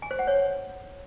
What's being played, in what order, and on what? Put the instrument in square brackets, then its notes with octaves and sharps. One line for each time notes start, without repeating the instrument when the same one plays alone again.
[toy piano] G#5
C5
F#5
C#5